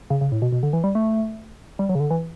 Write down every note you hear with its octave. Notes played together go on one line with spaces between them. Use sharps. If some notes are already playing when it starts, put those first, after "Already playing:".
C#3
C#3
A2
B2
B2
D3
E3
G3
A3
G3
F#3
C#3
D3
E3